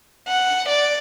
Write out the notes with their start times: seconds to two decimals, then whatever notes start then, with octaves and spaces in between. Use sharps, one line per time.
0.29 F#5
0.69 D5